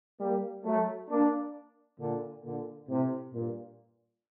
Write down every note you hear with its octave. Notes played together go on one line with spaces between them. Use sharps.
G3 A#3
F#3 A3
A#3 D4
A#2 D3
A#2 D3
A2 C3
G2 A#2